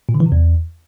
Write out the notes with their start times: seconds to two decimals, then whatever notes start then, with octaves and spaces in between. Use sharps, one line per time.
0.09 A#2
0.14 D3
0.20 E3
0.26 C3
0.32 E2